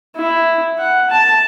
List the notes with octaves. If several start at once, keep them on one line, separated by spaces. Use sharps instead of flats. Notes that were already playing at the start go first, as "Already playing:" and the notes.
E4
F#5
A5